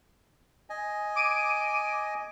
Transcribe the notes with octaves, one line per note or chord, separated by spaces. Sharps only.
D#5 G#5
D6 D7 D#7